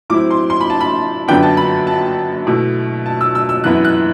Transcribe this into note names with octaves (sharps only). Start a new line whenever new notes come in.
A2 F#3 C4 E4 D6
C6
C6
B5
A5
B5
F#2 D3 F#3 B3 D4 G5
A5
B5
A5
B2 A3 E4
A5
E6
E6
E6
F#2 E3 B3 E4 F#6
F#6